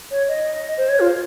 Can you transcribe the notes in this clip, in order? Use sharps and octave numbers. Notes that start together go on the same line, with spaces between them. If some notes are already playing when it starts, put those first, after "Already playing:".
C#5
D#5
D#5
C5
C#5
F4